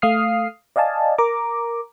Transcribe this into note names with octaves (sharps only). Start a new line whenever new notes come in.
A3 F5 D#6 F6 C7
D5 D#5 F5 G#5 A5
A#4 A#5 D6